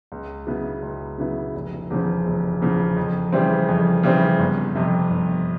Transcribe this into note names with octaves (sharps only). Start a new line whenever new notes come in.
C#2
C#3 F#3 B3 E4
C#2
C#3 F#3 B3 E4
F1
E2 C#3 F3
F1
E2 C#3 F3
F2
C#3 E3 G3 C4
F2
C#3 E3 G3 C4
G1
F2 C3
G1